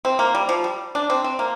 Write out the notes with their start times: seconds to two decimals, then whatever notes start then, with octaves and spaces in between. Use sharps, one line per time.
0.05 C4
0.19 A#3
0.35 G3
0.49 F3
0.64 G3
0.95 D4
1.10 C4
1.24 C4
1.39 A#3